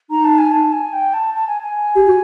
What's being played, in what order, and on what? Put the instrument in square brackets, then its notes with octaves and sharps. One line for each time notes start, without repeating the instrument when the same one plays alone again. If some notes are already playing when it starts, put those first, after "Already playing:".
[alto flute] D#4 [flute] A#5
[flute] A5
G#5
A5
G#5
G5
A5
A5
G#5
G#5
[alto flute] G4
F#4